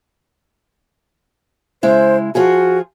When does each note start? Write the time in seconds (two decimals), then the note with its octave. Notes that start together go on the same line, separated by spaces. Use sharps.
1.83 C#3 G#3 E4 C5
2.35 F3 F4 F#4 G#4